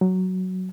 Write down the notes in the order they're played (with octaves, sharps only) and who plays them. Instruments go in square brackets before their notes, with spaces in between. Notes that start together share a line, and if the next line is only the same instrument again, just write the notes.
[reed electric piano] F#3